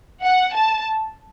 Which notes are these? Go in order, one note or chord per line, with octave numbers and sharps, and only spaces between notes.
F#5
A5